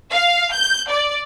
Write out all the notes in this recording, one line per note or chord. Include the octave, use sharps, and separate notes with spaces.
F5
G6
D5